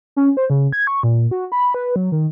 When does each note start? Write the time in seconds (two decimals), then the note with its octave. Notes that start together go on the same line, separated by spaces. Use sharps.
0.16 C#4
0.37 C5
0.50 C#3
0.73 G#6
0.87 C#6
1.03 A#2
1.31 F#4
1.52 B5
1.74 B4
1.96 F#3
2.12 D#3